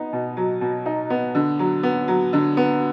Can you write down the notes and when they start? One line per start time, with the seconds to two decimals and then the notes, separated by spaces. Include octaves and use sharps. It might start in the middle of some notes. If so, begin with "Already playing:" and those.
Already playing: B3 D#4
0.13 B2
0.37 F#3
0.61 B2
0.86 D#4
1.10 B3
1.35 D3
1.59 F#3
1.83 B3
2.08 F#3
2.33 D3
2.57 B3